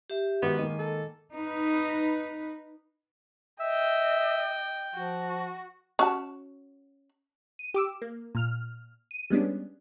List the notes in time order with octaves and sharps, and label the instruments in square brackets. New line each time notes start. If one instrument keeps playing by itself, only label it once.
[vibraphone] G4 E5
[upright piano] G#2 D#3 F#4 [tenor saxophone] B3
[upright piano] D#3 G#3 A#3 [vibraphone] D#5
[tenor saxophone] A4
[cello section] D#4 B4
[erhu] D#5 [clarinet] E5 [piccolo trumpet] G5
[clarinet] F3 [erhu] F#4
[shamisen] C#4 F#4 A5
[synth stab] D#7
G4 D6 E6
A#3
A#2 F6
D#7
G3 G#3 B3 C#4 D4